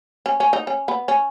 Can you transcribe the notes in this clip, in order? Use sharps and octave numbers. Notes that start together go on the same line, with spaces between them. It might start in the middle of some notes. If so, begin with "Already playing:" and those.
C#4
C#4
D#4
C#4
B3
C#4